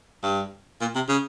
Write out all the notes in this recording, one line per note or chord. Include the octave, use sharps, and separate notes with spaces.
G2
A#2
C3
C#3